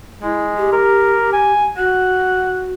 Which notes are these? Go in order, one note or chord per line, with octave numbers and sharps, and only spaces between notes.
G#3 E4
G4
A#4
G#5
F#4 F#5